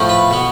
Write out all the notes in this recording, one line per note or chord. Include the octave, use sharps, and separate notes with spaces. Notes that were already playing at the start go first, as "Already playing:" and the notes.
Already playing: A2 F3 A3
B4
B2 B3